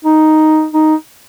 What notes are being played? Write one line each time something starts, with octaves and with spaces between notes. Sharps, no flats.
D#4
D#4